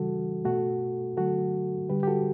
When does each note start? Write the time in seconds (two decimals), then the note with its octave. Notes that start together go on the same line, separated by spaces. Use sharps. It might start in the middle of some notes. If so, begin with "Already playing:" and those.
Already playing: C#3 E3 G3 F#4 A4
0.45 B2 A3 F#4 A4
1.17 D3 F#3 A3 F#4 A4
1.90 D3 G3 G4 B4
2.03 G4
2.07 F#4 A4